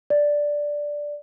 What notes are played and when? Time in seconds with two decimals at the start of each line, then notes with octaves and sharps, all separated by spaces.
0.10 D5